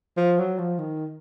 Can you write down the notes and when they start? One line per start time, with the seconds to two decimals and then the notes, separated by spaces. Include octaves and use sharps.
0.17 F3
0.38 F#3
0.58 F3
0.79 D#3